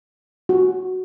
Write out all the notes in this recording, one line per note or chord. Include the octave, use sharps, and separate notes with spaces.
F#4